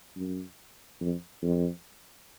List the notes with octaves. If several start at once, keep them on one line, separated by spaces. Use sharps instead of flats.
F#2
F2
F2